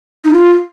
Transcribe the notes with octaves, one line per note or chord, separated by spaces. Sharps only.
D#4
F4